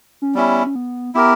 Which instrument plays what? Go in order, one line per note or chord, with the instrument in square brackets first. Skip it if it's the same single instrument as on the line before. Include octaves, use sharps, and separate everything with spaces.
[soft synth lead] C#4
[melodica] G3 C#4 E4 [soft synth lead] B3
[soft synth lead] C#4
B3
[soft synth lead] B3 [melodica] E4 G4 A#4